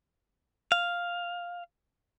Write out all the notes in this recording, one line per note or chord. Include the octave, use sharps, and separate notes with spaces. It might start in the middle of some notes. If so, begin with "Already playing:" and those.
F5